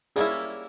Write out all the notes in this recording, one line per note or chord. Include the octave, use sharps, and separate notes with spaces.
G3 A#3 C#4 E4 G#4